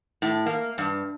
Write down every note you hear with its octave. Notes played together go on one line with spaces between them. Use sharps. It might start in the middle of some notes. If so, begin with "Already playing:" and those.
A2
A#3
G2